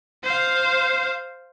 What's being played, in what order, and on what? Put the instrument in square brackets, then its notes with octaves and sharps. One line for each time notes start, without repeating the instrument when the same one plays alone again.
[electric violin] C5 F5